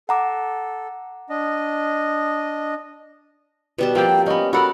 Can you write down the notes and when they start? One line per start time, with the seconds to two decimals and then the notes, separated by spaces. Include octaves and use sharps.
0.09 A4 F#5 A#5 D6
1.29 D4 D#5
3.78 B2 G3 A5
3.95 F3 A#3 C4 G4 G5
4.26 B3 C#4 D#5
4.53 B3 F#4 A4 A#4 F#5 B5